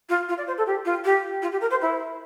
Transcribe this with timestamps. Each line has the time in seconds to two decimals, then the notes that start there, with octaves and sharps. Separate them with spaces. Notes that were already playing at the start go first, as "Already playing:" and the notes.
0.09 F4
0.28 F4
0.38 D5
0.47 C5
0.57 A4
0.66 G4
0.85 F4
1.05 G4
1.42 F4
1.52 G4
1.61 A#4
1.70 C5
1.81 E4